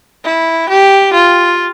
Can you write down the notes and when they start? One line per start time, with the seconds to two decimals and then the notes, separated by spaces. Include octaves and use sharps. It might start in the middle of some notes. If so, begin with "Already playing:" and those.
0.24 E4
0.70 G4
1.13 F4